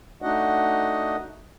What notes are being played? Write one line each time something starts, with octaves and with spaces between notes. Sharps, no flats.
A3 D4 D#4 F#4 D#5 F#5